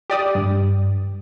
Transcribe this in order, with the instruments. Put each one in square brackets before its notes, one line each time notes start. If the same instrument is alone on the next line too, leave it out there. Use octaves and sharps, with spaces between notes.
[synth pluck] G4 D5 D#6
[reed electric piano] G2